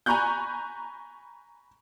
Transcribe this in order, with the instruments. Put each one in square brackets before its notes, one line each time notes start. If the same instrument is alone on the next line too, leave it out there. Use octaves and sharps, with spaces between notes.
[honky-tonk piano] G#5 A#5 B5 C#6 F#6 G6